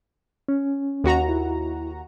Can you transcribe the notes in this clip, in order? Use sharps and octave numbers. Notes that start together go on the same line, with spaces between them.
C#4
D#2 F#4 A#5
E4